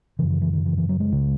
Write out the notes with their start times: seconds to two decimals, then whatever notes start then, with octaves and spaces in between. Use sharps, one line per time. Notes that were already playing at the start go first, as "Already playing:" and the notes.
0.19 C#3 E3
0.22 F#2
0.30 E3
0.42 E3
0.53 D#3
0.66 E3
0.78 E3
0.89 F#3
1.00 G#3
1.12 C#2 C#3